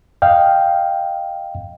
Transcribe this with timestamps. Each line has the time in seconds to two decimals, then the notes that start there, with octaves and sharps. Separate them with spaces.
0.22 D#5 F5 G5